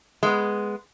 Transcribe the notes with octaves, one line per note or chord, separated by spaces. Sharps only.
G#3 A#3 B3